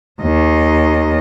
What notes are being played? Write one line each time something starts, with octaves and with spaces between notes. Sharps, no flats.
D#2 D#5